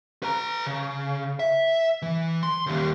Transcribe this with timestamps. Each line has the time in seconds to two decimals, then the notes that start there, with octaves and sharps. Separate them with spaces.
0.23 B4 A#5
0.66 C#3
1.39 E5
2.02 E3
2.43 C6
2.66 D#2 G3